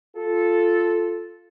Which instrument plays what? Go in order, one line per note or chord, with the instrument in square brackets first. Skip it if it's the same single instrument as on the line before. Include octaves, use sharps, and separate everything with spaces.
[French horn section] F4 A4